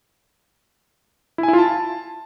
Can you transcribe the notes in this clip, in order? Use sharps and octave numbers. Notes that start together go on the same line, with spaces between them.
E4
G#5
E4
F4
A5